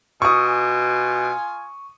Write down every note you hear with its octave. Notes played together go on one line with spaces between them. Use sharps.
B2 F4 G#5 C#6 D#6